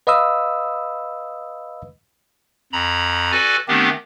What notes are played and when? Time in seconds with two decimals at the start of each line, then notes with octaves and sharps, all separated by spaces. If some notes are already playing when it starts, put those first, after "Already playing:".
0.07 B4 D#5 F5 B5 D#6 E6
2.73 F2 A#5 B5
3.32 F#4 A4 B4 D5 G#5
3.68 D#3 A3 B3 C4 D4 G4